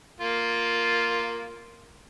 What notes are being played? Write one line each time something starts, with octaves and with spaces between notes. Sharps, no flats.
A#3 F4